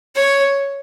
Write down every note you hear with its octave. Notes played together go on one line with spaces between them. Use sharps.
C#5